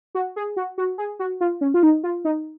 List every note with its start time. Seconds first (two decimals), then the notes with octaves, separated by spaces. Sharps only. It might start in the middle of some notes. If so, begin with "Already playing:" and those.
0.15 F#4
0.36 G#4
0.57 F#4
0.78 F#4
0.98 G#4
1.19 F#4
1.41 F4
1.61 C#4
1.74 F4
1.83 D#4
2.03 F4
2.25 D#4